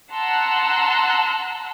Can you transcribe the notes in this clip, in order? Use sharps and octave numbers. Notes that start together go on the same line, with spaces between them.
F#5 A5 A#5 C6 E6 F#6